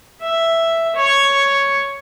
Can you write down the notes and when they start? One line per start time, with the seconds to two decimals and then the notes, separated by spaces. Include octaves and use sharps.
0.21 E5
0.96 C#5